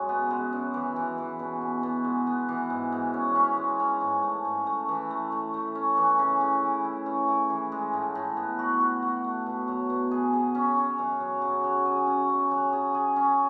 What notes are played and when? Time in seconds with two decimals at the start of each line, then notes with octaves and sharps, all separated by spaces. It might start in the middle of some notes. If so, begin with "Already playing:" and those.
Already playing: F#2 G#3
0.09 B3
0.30 G#3
0.53 F#2
0.74 E3
0.96 E3
1.18 E3
1.39 B2
1.62 B2
1.83 B2
2.04 G#3
2.27 B3
2.49 E3
2.70 G#2
2.92 G#2
3.14 C#4
3.35 C#4
3.57 G#3
3.80 C#4
4.01 G#2
4.23 A3
4.45 G#2
4.67 A3
4.88 E3
5.10 A3
5.32 A3
5.54 A3
5.75 C#4
5.97 E3
6.19 C#3
6.41 C#3
6.63 E4
6.85 E4
7.06 C#4
7.28 E4
7.50 E3
7.72 G#3
7.93 A2
8.15 A2
8.37 B3
8.59 F#4
8.80 F#4
9.02 F#4
9.24 A3
9.46 B2
9.68 F#3
9.90 B2
10.11 G#4
10.33 G#4
10.55 C#4
10.77 C#4
10.98 F#2
11.20 F#3
11.42 C#3
11.64 F#3
11.85 G#4
12.07 C#4
12.29 C#3
12.51 F#3
12.73 G#4
12.94 G#4
13.16 C#4